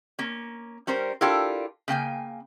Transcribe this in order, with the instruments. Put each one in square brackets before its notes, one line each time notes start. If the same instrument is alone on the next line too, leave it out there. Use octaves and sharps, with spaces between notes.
[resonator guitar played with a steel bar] A#3 C#4
G3 C#4 A#4 C5
D4 E4 F4 G4 A4 A#4
C#3 A#3 G5 G#5